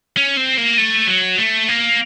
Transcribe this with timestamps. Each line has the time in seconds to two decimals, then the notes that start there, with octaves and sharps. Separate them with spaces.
0.17 C#4
0.37 C4
0.57 A#3
0.78 A3
1.07 F#3
1.38 A3
1.68 A#3